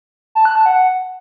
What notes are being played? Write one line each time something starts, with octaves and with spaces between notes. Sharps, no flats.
A5
F#6
A5
F#5